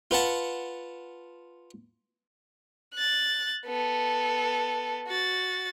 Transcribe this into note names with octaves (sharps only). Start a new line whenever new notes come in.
F4 B4 F#5 A5
F#6 A6
B3 A4
F#4 A6